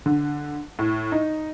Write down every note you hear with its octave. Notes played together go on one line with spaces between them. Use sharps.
D3
A2
D#4